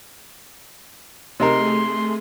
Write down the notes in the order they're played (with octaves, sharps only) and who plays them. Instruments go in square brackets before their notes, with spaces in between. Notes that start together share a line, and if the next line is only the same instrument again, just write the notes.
[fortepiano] C3 D#4 A#4 [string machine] A3 G#4 [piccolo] C6